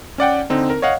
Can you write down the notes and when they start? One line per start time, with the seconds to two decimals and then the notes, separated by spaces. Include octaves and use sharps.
0.18 C#4 D5 F#5 G5
0.50 D3 C4 D#4
0.70 A#4
0.82 C#5 D#5 F5 F#5